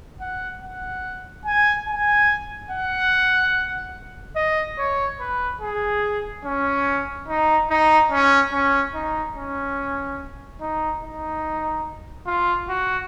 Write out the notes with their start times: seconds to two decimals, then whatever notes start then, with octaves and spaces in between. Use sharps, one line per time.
0.20 F#5
0.62 F#5
1.45 G#5
1.88 G#5
2.71 F#5
4.36 D#5
4.78 C#5
5.20 B4
5.61 G#4
6.45 C#4
7.28 D#4
7.70 D#4
8.11 C#4
8.53 C#4
8.94 D#4
9.36 C#4
10.61 D#4
11.02 D#4
12.27 F4
12.69 F#4